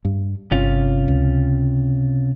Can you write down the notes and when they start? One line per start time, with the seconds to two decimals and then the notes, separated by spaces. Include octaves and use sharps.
0.05 G2
0.52 G1 C3 C#4 F4
1.08 C#2